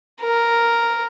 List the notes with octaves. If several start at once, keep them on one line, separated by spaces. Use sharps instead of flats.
A#4